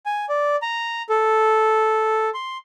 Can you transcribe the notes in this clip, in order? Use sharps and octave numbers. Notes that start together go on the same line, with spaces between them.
G#5
D5
A#5
A4
C6